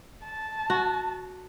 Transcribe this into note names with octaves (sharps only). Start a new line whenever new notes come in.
A5
F#4